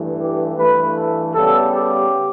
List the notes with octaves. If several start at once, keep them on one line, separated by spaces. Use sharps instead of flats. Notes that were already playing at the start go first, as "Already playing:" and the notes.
Already playing: G2 E3 A3
G4
G2 E3 A3 B4
A4
C#3 G3 B3 A4
G4